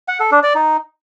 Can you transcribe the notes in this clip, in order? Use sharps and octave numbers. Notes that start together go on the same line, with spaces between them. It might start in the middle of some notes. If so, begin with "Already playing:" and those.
F#5
A4
D4
D5
D#4